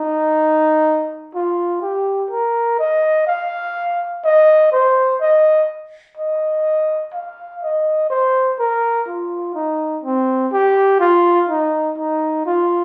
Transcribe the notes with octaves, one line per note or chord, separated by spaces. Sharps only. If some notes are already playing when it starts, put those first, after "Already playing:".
Already playing: D#4
F4
G4
A#4
D#5
F5
D#5
C5
D#5
D#5
F5
D#5
C5
A#4
F4
D#4
C4
G4
F4
D#4
D#4
F4